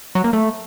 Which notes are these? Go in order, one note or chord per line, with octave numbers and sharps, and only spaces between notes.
F#3
A#3
A3